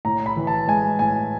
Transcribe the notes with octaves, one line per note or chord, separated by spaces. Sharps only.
A2 A#5
B5
E3
A5
G#3 G#5
A2 G#5